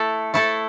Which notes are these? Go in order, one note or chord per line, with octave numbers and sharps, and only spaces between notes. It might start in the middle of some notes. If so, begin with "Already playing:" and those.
Already playing: A3 E4 A4
A3 E4 A4